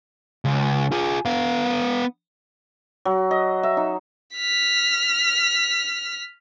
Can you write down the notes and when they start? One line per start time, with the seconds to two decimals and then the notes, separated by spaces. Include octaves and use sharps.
0.45 C#2
0.92 F4 G#4
1.25 B3 F5
3.05 F#3
3.31 D#5
3.63 E5
3.77 D#4
4.36 F6 B6